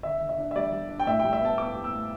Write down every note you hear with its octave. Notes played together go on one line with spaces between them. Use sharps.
D3 E5
D3
E5
D4
E5
G3 D5
G3
D4
G5
A2 E5
G3 G5
E5
B3 A5
B3 D6
G3
E6
A2